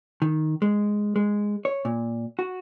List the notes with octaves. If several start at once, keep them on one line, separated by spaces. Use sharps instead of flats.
D#3
G#3
G#3
C#5
A#2
F#4